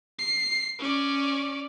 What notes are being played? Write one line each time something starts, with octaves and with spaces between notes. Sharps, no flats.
C7
C#4 D5